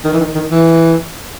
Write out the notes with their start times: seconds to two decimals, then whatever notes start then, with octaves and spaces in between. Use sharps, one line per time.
0.04 D#3
0.13 E3
0.20 D#3
0.35 D#3
0.51 E3